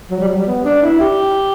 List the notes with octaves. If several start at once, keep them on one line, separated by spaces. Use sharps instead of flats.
F#3
G3
F#3
G3
B3
D4
E4
G4